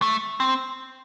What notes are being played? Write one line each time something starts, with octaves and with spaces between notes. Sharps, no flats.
A3
C4